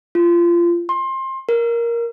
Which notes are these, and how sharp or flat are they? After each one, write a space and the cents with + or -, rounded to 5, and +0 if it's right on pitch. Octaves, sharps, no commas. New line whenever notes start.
F4 -25
C6 +25
A#4 +5